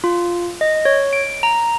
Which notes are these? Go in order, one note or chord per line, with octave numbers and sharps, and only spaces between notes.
F4
D#5
C#5
D7
A#5